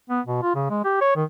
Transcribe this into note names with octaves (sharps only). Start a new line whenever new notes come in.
B3
B2
F4
C#3
G#3
G4
C#5
D#3